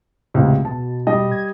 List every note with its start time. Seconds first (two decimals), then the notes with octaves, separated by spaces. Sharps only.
0.34 C#2 A2 C3
0.65 B2 A5
1.07 G3 D#5
1.32 G#6